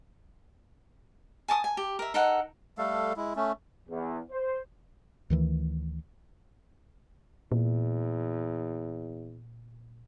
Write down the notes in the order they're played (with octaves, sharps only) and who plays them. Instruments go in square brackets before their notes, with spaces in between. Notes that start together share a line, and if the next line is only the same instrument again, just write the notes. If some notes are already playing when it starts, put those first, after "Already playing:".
[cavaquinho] G#5 A5 C#6 D#6
G#5
G4
A#4 E5
D#4 A4 A#4 F#5
[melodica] G3 A3 A4 F5
G#3 E4
A3 C#4
[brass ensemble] E2
C5
[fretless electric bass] D2 D#3 E3
[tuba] E2 [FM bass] A#2